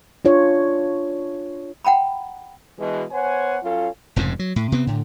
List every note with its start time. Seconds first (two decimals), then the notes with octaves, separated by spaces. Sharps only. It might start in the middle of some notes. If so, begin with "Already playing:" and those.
0.25 D4 F4 C#5
1.85 F#5 G5 A#5 B5
2.79 B2 E3 G#3
3.12 B3 C5 C#5 F#5 G#5
3.63 F#3 C#4 F4 A4 F5
4.16 F1 F2 G#2 C#3
4.39 F#3
4.56 A2
4.72 C3 B3 C4
4.87 A2 D3